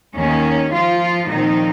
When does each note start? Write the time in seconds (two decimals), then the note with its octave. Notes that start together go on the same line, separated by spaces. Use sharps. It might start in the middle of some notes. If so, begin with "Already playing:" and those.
0.15 D#2 D#3 A#3 C#4
0.72 F3 F4
1.28 A#2 D#3 F3 C4 D#4